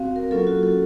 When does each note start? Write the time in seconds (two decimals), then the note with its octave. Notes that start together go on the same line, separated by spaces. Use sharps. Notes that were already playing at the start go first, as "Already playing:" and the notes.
Already playing: C4 F#4 F5
0.16 A#4
0.31 F#3 A#3 C#4 F4 A4
0.47 F#4
0.63 A4